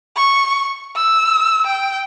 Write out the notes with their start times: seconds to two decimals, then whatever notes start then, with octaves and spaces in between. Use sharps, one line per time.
0.16 C#6
0.96 E6
1.66 G5